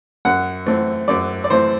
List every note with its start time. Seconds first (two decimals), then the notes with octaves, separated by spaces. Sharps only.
0.25 F#2 F#5
0.66 E3 A3 C4
1.08 F#2 D5
1.44 D5
1.50 E3 A3 C4 C5